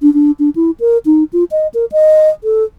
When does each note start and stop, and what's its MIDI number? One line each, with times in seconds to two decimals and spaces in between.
0.02 0.13 62
0.14 0.31 62
0.39 0.50 62
0.56 0.71 64
0.80 0.98 70
1.06 1.24 63
1.33 1.44 65
1.51 1.67 75
1.74 1.85 70
1.92 2.29 75
2.44 2.64 69